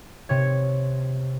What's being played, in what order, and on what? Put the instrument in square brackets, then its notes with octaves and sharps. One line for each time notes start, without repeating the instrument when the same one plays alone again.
[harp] C3 C#5